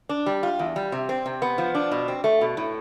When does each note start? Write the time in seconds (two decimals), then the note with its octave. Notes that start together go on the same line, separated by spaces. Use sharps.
0.09 D4
0.26 G3
0.43 F4
0.59 E2
0.76 G3
0.92 C3
1.09 C4
1.26 C3
1.42 B3
1.58 F3
1.75 D4
1.91 B2
2.08 C4
2.24 A3
2.41 B2
2.57 A2